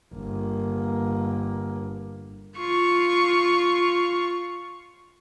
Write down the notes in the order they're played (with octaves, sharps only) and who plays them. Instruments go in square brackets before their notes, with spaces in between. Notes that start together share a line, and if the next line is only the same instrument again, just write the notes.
[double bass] G1 A#3
[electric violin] F4 C#6